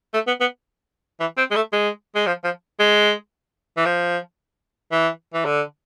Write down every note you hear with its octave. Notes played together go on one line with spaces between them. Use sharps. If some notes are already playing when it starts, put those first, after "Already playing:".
A3
B3
B3
E3
C4
G#3
A3
G#3
G#3
F3
F3
G#3
E3
F3
E3
E3
D3